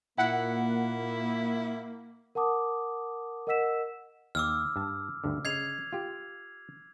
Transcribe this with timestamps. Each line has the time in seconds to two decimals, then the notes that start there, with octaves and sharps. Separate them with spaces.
0.18 A#2 A#3 E4 F#5
2.35 A#4 F#5 A5 D6 D#6
3.47 A#4 D#5 F#5 E6 B6 E7
4.35 D#2 D6 E6 F6
4.76 G2 A5
5.24 D2 G2 D3
5.45 C#3 D#5 G#6 C7 F7
5.93 F4 G4